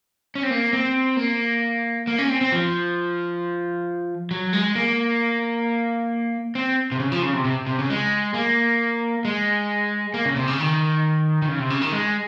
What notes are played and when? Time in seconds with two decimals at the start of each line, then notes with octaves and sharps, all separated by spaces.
0.35 C#4
0.43 C4
0.50 A#3
0.73 C4
1.17 A#3
2.07 A#3
2.18 C#4
2.29 C4
2.41 C4
2.52 F3
4.31 F#3
4.53 G#3
4.76 A#3
6.55 C4
6.92 C3
7.00 C#3
7.12 F3
7.23 C#3
7.33 C3
7.45 C3
7.67 C3
7.79 C#3
7.90 G#3
8.34 A#3
9.25 G#3
10.14 A#3
10.25 C#3
10.36 C3
10.47 C#3
10.59 D#3
11.42 D#3
11.49 C#3
11.59 C3
11.70 C#3
11.82 D#3
11.93 G#3